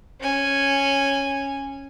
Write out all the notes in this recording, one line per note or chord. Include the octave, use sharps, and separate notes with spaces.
C#4 G#5